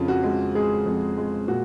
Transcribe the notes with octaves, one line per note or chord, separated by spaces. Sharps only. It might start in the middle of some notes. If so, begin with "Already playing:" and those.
Already playing: F2 C#3 F4
F#4
G#3
G#3 G#4
F2
G#3
A#2 F#4